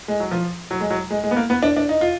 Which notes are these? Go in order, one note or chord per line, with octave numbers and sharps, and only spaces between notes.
G#3
F#3
F3
F#3
G#3
F#3
G#3
G#3
B3
A#3
B3
D4
D4
D#4
F4